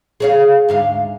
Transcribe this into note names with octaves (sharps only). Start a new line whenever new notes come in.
G#4 C#5 F5
D2 G#2 F5